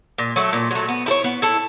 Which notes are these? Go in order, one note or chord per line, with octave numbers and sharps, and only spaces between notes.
A#2
F#3 A3
A#2
F#3 A3
B3
E4 A4 C#5
B3
E4 A4 C#5